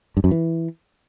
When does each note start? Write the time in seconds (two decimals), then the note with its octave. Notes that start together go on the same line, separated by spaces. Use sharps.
0.17 G2
0.24 F#2
0.31 E3